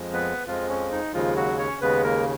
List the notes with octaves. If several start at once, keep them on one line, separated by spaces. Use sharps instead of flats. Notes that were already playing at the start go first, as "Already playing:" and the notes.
Already playing: F2 F3 G#3
B3 B4
F2 F3 G#3 F4
C#4
D#4
D#2 C#3 F3 G#3 F4
F#3 F#4
C#4 C#5
D#2 C#3 G#3 B3 B4
A#3 A#4